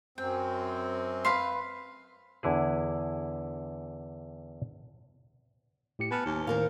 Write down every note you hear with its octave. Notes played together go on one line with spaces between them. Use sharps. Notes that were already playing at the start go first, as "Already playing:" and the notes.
F#2 C4 G5
B4 F5 C6
E2 D3 E4 G#4
A2 G4 C#7
B3 G#5 A5 F6
D#2
A2 D#3 C4 A#4 F5